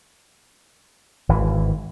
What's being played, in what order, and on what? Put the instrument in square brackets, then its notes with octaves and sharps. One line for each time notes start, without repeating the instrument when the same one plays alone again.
[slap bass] G#1 E3